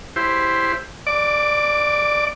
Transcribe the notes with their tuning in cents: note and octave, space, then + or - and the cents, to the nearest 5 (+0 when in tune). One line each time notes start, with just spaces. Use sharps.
E4 +0 G4 +0 C5 +0
D5 +15 D6 -10